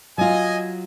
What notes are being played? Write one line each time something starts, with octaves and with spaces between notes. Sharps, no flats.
F#3 F4 D#5 G#5